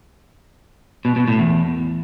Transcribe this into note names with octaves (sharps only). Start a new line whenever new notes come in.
B2
B2
A2
E2